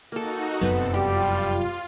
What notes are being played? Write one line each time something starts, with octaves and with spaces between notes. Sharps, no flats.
A#3 D#4 F#4 A4
F1 F#2 F#3 B3 C4 A4 B4
G3 F4 G4